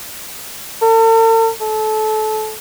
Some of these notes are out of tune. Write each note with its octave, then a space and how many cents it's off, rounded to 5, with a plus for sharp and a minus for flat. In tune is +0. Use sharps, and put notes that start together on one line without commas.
A4 +45
A4 -25